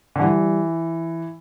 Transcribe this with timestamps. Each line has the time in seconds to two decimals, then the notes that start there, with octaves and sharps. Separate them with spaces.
0.16 D3
0.19 E3 G3